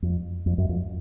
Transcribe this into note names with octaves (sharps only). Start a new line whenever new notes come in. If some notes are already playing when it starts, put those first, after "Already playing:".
F2
F2
F#2
F2